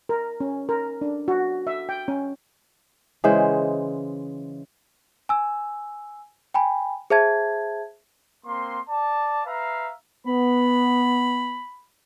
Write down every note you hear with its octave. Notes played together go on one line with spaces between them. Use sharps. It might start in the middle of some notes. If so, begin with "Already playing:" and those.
A#4
C#4
A#4
D4
F#4
E5
G5
C#4
C#3 E3 G#3 C5
G#5 E6
G5 G#5 B5
G#4 C5 E5 A5 G#6
A#3 C4 C6
D5 A5
B4 E5 F5 A#5
B3 B5